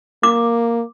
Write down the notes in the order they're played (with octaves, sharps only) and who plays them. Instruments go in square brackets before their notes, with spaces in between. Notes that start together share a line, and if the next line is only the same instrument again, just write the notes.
[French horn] A#3 [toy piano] D6